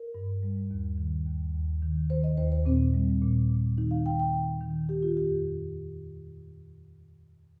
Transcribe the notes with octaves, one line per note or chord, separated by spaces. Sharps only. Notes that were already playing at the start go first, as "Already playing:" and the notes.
Already playing: A#4
G2
G3
D#2
D#3
D#2
D#2
D#3
D#3 C5
D#5
D#2 C5
C5
A#2 C4
G3
A#2
A#2
D#3 D#4
F5
D#3 G5
G5
D#3 G5
D#3
D#3 G4
F4
F2 G4